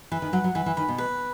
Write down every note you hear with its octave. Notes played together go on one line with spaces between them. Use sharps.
E3 B4
D#3
F#3 F#5
F#3
E3 B4
E3
D#3 B5
B2
B4